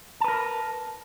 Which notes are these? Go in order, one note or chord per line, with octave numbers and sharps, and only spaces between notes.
A#4 B4 A5